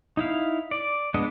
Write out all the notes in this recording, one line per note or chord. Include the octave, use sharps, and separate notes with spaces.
D#4 E4 F5
D5
G#3 B3 D4 D#5